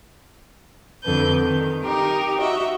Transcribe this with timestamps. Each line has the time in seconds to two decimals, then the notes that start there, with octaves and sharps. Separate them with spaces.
1.04 F2 D3 A4 B4 G6
1.42 D#3
1.83 D#4 G4 A#4
2.39 F#4 D#5 E5